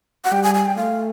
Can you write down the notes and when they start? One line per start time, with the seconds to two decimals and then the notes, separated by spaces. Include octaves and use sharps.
0.24 F#5
0.32 G3 G5
0.43 G#5
0.55 G#5
0.66 G5
0.77 A3 F5